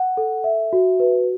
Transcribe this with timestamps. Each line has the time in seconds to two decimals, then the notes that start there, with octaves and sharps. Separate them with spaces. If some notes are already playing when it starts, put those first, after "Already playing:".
Already playing: F#5
0.17 A4
0.44 E5
0.73 F#4
1.00 B4